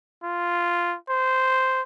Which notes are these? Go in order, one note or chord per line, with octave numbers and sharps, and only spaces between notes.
F4
C5